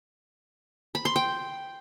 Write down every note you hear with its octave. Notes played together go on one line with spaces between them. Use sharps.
B5
C6
G5